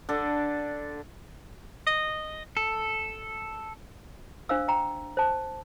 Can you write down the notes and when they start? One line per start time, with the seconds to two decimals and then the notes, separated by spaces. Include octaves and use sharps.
0.09 D3 D4 A4
1.87 D#5
2.57 A4
4.49 D4 C5 F5 E6
4.68 G5 A#5
5.17 C5 A5